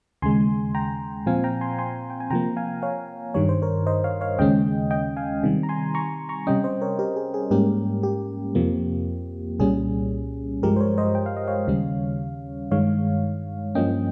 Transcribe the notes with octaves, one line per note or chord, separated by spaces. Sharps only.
D#2 C#3 G#3 G#5 C6
G5 A#5
A#2 F3 C4 F5 G#5
G5 A#5
G#5 C6
G#5 C6
G5
G#5
C3 F3 A#3 G5 A#5
F5 G#5
C#5 F5
G2 D#3 G3 C#5
C5
A#4 C#5
C5 D#5
C#5 F5
C#5 F5
D#2 C#3 G#3 C#4 D#5 G5
D#5 G5
F5 G#5
C3 D#3 G3
A#5
G#5 C6
A#5 C#6
A#5 C#6
C3 G3 C#4 D#5 G5
C5 D#5
A#4 C#5
G4 A#4
G#4
G#4
G#2 G3 A#3 C#4 G4 A#4
G4
F2 C3 F3 A#3
C2 A#2 G3 C#4 G#4
G2 F3 G#3 G4 A#4
C5
A#4 C#5
C5 D#5
G5
F5
D#5
C#5 F5
D#2 C#3 G3 C#4
G2 D#3 G#3 C#5 F5
G2 F3 A#3 C#4 D#5 G5